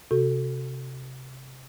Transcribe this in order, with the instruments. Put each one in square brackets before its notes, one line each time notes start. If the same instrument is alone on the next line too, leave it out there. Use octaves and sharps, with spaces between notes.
[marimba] C3 F#4 A4